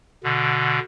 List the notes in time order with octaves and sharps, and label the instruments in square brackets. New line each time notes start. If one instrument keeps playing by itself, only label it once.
[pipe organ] B2 D3